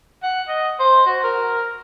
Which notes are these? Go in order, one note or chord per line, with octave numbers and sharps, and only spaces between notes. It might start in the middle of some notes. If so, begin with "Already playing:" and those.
F#5
D#5
C5
F#4
A#4